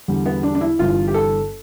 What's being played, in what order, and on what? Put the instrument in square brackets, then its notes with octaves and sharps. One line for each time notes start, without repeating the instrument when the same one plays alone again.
[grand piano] E2 D3 G3
[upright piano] B3
D4
D4
E4
[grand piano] G1 G2 E3 [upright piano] F4
[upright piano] G4
A4